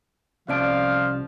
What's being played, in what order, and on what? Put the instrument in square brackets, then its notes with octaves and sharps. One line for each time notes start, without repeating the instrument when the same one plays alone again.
[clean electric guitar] C2 C#4 A5 [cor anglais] F3 [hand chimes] C4 D5 D7 [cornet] F5